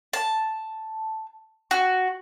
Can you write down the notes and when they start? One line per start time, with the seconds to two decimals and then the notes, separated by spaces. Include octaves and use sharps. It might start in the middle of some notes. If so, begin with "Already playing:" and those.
0.13 A5
1.71 F#4